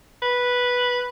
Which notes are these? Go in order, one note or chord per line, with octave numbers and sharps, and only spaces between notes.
B4